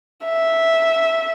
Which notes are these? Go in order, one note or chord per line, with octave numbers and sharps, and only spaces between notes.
E5